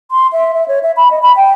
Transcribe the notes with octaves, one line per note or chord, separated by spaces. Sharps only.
C6
E5
E5
C#5
E5
B5
D#5
B5
G5